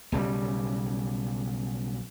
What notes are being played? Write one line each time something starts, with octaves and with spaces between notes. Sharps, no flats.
B1 C#3 E3 G3